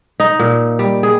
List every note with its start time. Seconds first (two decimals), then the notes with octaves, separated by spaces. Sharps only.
0.20 D#4
0.39 A#2
0.79 G3
1.03 G#4